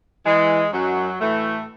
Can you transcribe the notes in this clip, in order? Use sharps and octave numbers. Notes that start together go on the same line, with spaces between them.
E3 G#3
F#2 F#3
A2 E3 A3